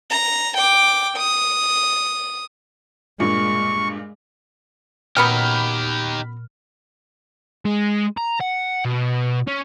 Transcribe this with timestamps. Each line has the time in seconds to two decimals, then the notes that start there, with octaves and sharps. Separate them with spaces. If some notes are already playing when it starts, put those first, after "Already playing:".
0.11 A#5
0.57 G5 D6
1.17 D#6
3.20 G2 A#2 G#3 C#6
5.17 A#2 F#3 B3 C#4 D#4 G4 B5 F6
7.65 G#3
8.17 A#5
8.41 F#5
8.85 B2
9.47 C#4